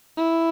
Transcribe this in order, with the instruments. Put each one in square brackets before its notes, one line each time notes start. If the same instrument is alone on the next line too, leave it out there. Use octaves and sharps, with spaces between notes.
[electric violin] E4